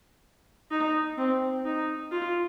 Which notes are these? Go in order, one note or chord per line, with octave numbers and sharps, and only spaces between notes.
D#4
C4
D#4
F4